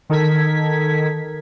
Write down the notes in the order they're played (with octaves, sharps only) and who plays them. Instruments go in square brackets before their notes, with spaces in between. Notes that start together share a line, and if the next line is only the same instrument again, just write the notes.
[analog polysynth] D#3 D#4 A4 A#4 G#6 B6